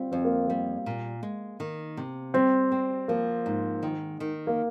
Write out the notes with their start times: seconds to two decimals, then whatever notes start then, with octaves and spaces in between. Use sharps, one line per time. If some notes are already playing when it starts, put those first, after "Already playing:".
Already playing: G3 C4 F4
0.12 F2 C4
0.25 A#3
0.48 G3 A#3
0.86 A#2
1.23 G#3
1.60 D#3
1.97 C3
2.34 G3 C4
2.72 C4
3.08 F3 A#3
3.46 G#2
3.83 D#3
4.20 D#3
4.47 A#3